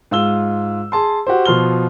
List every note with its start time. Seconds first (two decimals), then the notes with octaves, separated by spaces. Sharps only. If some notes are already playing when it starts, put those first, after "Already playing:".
0.11 G#2 F4 E6 G7
0.92 G#4 A5 C6
1.27 F#4 G4 C5
1.45 B2 F3 C6 F6 G7